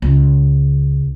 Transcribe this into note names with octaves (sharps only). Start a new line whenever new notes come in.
C#2